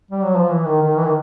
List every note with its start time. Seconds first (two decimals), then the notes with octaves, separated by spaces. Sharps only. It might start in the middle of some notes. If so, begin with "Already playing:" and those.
0.11 G3
0.23 F#3
0.37 F3
0.51 E3
0.65 D#3
0.82 D#3
0.97 E3
1.05 D#3